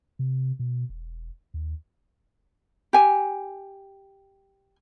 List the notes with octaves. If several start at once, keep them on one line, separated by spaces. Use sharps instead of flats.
C3
B2
E1
D#2
G4 G#5